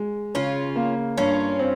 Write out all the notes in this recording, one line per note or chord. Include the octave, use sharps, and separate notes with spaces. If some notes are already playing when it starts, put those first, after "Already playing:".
Already playing: G#3
C#3 C#4 F4
A#3
G2 C#4 F4
C4